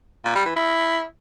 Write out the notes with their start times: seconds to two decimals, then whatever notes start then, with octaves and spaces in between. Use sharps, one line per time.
0.25 A#2
0.35 G3
0.45 E3
0.56 E4